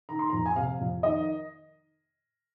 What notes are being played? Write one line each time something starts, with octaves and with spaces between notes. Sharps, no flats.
D#3 A#5
C6
A#5
F2
G#5
C3 F5
F2
D#3 D#5